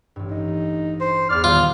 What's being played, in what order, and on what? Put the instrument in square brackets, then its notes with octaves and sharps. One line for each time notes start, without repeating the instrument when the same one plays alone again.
[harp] A1 G2
[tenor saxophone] D#4
C5
[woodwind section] E2 F6 [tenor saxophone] D5
[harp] A#2 D#3 [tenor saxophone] G3 [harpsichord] F4